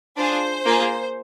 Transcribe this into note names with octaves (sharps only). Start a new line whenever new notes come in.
D4 F4 G#4 C5
A#3 F4 G#4